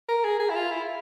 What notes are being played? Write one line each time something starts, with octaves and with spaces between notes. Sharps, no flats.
A#4
G#4
G#4
E4
F4
E4